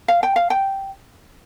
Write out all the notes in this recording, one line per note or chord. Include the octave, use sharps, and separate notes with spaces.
F5
G5
F5
G5